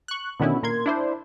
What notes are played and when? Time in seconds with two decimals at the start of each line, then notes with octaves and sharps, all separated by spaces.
0.08 C#6 F#6
0.40 B2 D3 D#3 B3 C#4 E4
0.63 A#2 A#4 C6 G#6
0.86 D4 E4 C5